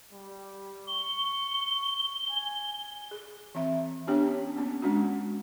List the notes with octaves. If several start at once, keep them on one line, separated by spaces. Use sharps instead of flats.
G3
C#6 G7
G#5
G#4
E3 C4 E5
B3 D4 G4 C#5 G5
C#4
A#3 B3 C#4
G#3 C#4 D4 F#4